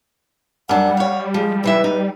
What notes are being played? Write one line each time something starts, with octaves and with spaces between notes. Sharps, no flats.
F#2 G3 D4 F#5
C#5 F5
F3 G#3
C3 E3 B4 E5
D#4